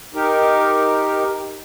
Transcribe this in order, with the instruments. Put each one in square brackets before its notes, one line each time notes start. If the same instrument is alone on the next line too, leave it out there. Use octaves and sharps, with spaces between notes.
[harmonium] D#4 G4 A#4